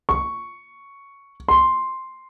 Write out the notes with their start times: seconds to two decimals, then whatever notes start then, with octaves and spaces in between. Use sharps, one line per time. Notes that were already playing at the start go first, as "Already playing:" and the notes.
0.09 C#6
1.48 C6